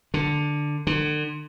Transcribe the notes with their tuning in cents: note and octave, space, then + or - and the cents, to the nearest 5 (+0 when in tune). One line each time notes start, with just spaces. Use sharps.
D3 +5
D3 +40